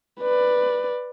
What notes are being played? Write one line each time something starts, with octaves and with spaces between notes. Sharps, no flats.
B4 D5